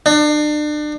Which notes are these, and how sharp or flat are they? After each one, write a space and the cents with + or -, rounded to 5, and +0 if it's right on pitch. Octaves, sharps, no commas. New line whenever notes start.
D4 +35